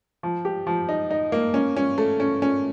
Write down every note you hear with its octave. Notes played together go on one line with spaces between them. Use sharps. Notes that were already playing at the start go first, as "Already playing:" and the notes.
F3
G4
F3
D#4
D#4
A#3
C#4
C#4
A3
C#4
C#4